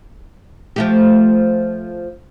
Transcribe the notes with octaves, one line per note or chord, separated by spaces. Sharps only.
F3 A3 G4